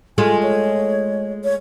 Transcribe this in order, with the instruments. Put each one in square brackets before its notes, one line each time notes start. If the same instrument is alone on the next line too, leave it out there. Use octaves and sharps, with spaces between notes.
[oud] G#3 A3 F4 [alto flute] G#5
[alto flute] C#5
C#5